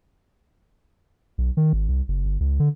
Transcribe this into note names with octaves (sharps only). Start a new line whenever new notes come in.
B1
D#3
G#1
C2
F#1
G1
C#2
D3